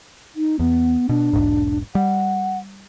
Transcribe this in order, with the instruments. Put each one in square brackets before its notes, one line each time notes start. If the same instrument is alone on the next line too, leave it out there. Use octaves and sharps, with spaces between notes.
[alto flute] D#4
[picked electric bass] E2 [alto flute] B3
[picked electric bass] B2 [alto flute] D4
[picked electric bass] E1 B1 G#2
[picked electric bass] G3 [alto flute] F#5